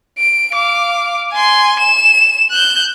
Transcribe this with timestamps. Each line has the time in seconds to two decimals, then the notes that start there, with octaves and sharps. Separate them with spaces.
0.18 D7
0.53 F5 D6
1.33 G#5 C6
1.80 E7
2.51 F#6 G6